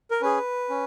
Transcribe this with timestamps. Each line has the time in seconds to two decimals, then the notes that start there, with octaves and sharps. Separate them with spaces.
0.11 A#4
0.22 C#4 G#4 B4
0.70 C#4